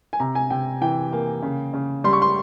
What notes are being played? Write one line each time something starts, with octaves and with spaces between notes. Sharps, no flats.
G#5
C3 A#5
G#5
C3 G5
E3 G5
A#3
C#3
C#3
G3 C6
C#6
C6